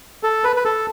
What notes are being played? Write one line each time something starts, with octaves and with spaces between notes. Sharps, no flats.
A4
B4
B4
A4